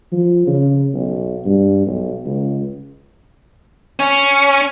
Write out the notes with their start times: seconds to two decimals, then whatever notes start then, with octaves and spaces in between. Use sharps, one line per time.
0.12 F3
0.47 C#3
0.94 B1
1.45 G2
1.87 B1
2.26 C#2
3.99 C#4